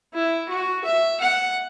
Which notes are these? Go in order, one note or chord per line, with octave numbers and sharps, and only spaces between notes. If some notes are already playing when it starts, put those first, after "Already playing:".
E4
F#4
E5
F#5